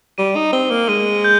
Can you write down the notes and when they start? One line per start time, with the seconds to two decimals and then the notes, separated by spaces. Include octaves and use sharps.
0.18 G3 D#7
0.36 D#4
0.53 C4 G7
0.70 A#3
0.89 G#3 D#7
1.24 G6